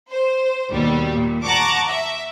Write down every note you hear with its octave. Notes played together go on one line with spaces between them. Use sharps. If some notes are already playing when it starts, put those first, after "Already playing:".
C5
D#2 B2 G3
A#2
F#5 A5 A#5 C#6 D6
E5